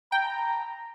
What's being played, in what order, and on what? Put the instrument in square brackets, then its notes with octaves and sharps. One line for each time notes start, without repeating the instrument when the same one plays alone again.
[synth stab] G5 [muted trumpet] A#5